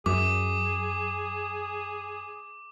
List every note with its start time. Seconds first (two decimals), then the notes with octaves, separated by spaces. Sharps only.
0.06 F#2 G#4 D6